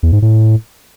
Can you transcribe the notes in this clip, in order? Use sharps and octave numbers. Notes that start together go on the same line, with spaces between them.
E2
G#2
A2